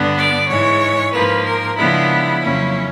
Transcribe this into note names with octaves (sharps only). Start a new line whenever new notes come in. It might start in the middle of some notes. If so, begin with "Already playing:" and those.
Already playing: G2 D3 G3 B3 D4
D5
G#2 E3 G#3 C#5
G#2 F3 A#3 B4
A#4
C#3 F3 G#3 B3 D4 E4
F2 C#3 F#3 A#3 C#4